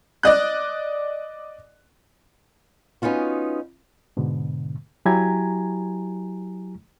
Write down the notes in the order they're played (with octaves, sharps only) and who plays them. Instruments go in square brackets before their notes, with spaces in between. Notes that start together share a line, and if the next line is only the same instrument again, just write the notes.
[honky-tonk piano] D5 D#5 F#6
[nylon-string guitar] B3 C#4 D#4 F4 F#4
[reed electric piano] G#2 B2 D3
F#3 E4 G4 G#5 A#5 G#6